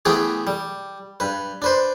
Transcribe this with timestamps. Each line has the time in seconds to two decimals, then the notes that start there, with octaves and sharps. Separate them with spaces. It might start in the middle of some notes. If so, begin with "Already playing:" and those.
0.05 E3 A3 B3 G4 G#4
0.47 G3
1.20 G2 B4
1.62 D4 B4 C5